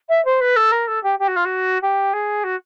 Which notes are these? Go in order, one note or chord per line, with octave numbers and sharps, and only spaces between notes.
E5
C5
B4
A4
A#4
A4
G4
G4
F#4
F4
F#4
G4
G#4
F#4